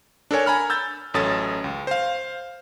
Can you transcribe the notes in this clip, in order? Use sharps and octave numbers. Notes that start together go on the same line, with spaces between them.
D4 A4 A#4 C#5 G#5
G#5 A#5 B5 F6
E6 G6 A6
A1 F#2 C#4 A4 D#6 A6
C#2
C5 F5